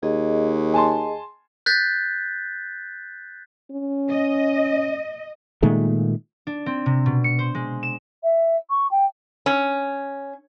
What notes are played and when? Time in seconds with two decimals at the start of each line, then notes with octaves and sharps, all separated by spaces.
0.03 D#2 G#4 D#5
0.74 G#5 A5 C6
1.66 F#6 G6 A6 B6
3.71 C#4
4.10 D#5
5.62 A#2 D#3 G#3 A3
6.47 D4
6.66 C4
6.86 C3
7.06 B2
7.24 C#7
7.39 C5
7.55 G#3
7.83 E7
8.23 E5
8.70 C#6
8.91 G5
9.46 C#4